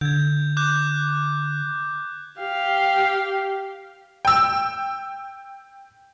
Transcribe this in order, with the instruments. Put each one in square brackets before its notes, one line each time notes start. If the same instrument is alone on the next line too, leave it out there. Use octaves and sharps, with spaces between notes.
[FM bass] D3 [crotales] G6 G#6
[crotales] D6 F#6 G6
[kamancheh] G4 F5
[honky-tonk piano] G5 E6